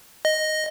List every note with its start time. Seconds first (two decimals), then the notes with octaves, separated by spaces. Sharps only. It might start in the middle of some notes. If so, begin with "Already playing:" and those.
0.25 D#5